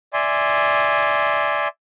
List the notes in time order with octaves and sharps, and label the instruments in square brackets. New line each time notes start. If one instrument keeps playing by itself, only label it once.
[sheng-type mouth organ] D5 E5 G#5 C6